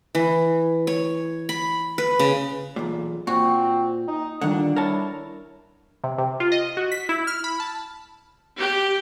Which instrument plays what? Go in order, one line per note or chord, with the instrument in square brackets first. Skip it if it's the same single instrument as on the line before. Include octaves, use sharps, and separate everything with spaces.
[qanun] E3
C#5
B5
B4
C#3
[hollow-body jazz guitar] B1 E2 A#2
[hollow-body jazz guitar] A#2 [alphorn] C4 [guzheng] F#4
[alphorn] D#4
[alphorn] A#2 [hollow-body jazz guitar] D3 D#3 [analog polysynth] G3 D4 [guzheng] F#5
[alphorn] E4 [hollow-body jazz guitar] A#4 C#5 A5
[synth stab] C3
C3
F4
D#5
F#4
B6
E4
F6
B5
A5
[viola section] G4